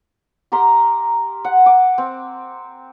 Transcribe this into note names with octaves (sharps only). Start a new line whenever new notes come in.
G4 A#4 A#5 C6
F#5
D6
C4